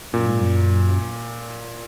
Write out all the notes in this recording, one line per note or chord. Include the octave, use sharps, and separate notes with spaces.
F#2 A#2
G#2
F#2